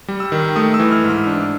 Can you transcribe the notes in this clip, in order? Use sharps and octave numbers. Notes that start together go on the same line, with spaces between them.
G3
E6
D#3
A3 D#6
E6
E3
F6
G#2
F6
D4